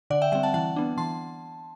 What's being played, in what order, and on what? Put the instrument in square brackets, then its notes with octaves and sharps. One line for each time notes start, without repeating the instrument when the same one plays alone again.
[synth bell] D3 D5 F#5
E5 G5
G3 C4 E5 G5
F#5 A5
E3 F#5 A5
B3 D4
E3 A5 C6